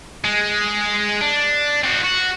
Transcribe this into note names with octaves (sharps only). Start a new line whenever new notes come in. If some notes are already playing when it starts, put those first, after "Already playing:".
G#3
D4
C4 F#4
F#4